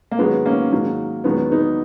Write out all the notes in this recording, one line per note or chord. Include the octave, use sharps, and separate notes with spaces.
A#3
G#2 D#3 F#3 G#3 B3
A#3 C#4
G#2 D#3 F#3 A#3
E2 D#3 F#3 G#3 B3
B3 D#4